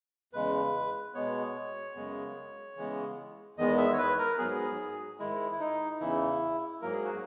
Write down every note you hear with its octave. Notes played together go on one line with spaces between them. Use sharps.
E2 C#3 G#3 B4
B2 G#3 B3 C#5
F#2 C#3 G#3 B3
C#3 E3 G#3 B3
E2 D#3 G#3 B3 D#5
E5
C#5
B4
A#4
G#2 F#3 B3 G#4
G#2 D#3 G#3 E4
E4
D#4
E2 C#3 E3 E4
G#2 F#3 A#3 A#4
G#4
F#4